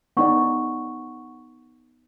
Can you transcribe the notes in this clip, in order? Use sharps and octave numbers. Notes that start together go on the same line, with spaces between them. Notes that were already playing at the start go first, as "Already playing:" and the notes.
B3 D#4 D5 F#5 C#6